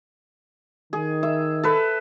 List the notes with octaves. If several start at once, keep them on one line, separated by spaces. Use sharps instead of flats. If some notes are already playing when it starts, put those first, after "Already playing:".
D#3 G#4
E5
A4 B4